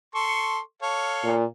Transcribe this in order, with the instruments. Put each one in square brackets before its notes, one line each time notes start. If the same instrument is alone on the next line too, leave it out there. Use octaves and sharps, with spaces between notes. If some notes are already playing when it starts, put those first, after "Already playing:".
[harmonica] A4 C6 C#6
A4 C#5 F5
[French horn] A#2